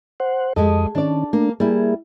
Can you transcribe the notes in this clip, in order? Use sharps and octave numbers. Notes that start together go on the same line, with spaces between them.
C5 F#5
F2 G#3 G4 A4 D#5
D#3 C#4 D4 D5
A3 A#3 D4
G3 A#3 E4 G#4